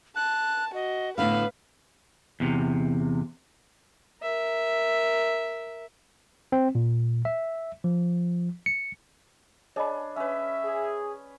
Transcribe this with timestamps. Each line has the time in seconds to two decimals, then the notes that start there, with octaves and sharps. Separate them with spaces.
0.16 A5 F#6
0.74 F#4 D#5
1.18 A2 D3 B3 B4 F5 B5
2.40 E2 C3
4.22 A#4 E5
6.52 C4
6.75 A#2
7.25 E5
7.84 F3
8.66 C#7
9.76 D4 G#4 C#5 D#5 B5
10.16 C#4 B4 E5
10.65 G#4